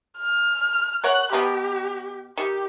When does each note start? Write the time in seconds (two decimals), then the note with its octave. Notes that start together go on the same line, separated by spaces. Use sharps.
0.18 F6
1.04 A#4 C#5 F#5 F#6
1.33 B2 B3 G4 A#4
2.38 D#3 G4